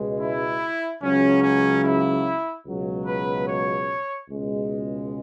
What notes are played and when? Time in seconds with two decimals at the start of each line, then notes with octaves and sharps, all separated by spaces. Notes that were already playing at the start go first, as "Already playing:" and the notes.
Already playing: C#2 B2 G#3
0.21 E4
1.02 C#2 C#3 F#3 C#4
1.43 C#4
1.84 E4
2.66 C#2 B2 F#3
3.07 B4
3.48 C#5
4.29 C#2 B2 G#3